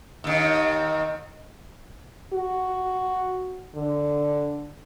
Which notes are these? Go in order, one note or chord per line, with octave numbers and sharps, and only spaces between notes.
D#2 D#3
F#4
D3